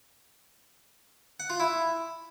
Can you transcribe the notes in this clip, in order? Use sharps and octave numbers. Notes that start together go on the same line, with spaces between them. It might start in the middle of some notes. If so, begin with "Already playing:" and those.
F#5
F4
E4